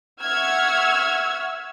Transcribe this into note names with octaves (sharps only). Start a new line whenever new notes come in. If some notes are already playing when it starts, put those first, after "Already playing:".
E5 F#5 C#6 E6 F6 G#6